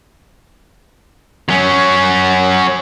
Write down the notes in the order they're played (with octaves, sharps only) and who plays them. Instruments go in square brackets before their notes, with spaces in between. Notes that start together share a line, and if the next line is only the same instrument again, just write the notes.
[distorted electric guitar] F#3 C#4